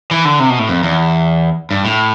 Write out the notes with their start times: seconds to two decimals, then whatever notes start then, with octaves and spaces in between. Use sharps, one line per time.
0.11 E3
0.25 D3
0.40 C3
0.50 B2
0.59 A2
0.69 F2
0.83 E2
1.71 G2
1.85 A2